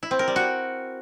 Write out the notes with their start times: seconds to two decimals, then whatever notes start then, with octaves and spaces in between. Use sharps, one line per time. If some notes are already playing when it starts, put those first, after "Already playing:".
0.03 E4
0.11 C4
0.19 A#4
0.28 G3
0.36 F#4